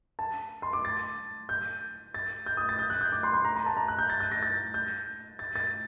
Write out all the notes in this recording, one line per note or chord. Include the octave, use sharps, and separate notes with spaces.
A5
C6
D6
A6
G6
A6
G6
D#6
A6
G6
F#6
G6
D6
C6
C6
A#5
A#5
A5
A#5
F#6
G6
A6
G6
A#6
A6
G6
A6
A6